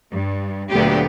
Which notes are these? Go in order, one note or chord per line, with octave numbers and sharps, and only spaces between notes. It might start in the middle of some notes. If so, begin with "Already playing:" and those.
G2
D2 A#2 D3 F#3 B3 G4